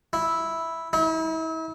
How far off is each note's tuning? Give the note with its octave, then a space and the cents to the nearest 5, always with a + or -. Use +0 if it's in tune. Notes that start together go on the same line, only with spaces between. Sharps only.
E4 -5
E4 -40